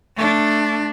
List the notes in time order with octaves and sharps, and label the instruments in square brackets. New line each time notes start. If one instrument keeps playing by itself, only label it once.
[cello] A3 D4